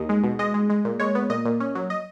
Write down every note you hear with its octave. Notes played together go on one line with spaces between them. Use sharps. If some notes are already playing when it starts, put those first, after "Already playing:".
Already playing: D#2 D#5
G#3
B2
G#3 D#5
G#3
G#3
A#2
G#3 C#5
B3
A#2 D#5
A#2
C#4
F#3
D#5